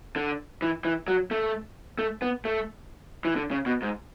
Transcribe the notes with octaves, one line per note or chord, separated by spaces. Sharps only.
D3
E3
E3
F#3
A3
A3
B3
A3
E3
D3
C#3
B2
G#2